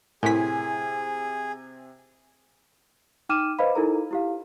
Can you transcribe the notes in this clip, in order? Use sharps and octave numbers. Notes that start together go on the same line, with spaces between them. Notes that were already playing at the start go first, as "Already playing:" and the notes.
A2 C3 E4 G#4 A#4 G#5 B6
D#4 G5 D6 F6 D#7 E7
B4 C5 D#5 F5 B5
D#4 E4 A4 A#4 A#5
E4 G4 F5